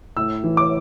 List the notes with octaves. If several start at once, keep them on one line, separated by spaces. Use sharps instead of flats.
A2 E6
E3
D6